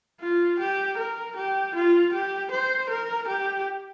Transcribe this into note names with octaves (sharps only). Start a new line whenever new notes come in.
F4
G4
A#4
G4
F4
G4
C5
A#4
G4